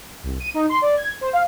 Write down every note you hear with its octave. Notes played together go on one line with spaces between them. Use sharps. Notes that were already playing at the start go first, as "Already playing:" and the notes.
C2
D#7
D#4
C6
D5
G#6
C5
F5